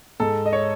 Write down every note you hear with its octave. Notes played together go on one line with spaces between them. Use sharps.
G#2 A4
D#5
C#5